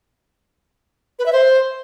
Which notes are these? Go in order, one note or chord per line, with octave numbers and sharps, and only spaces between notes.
B4
E5
C5